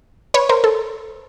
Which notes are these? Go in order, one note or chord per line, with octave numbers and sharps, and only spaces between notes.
B4 C#5
A#4 C5
A4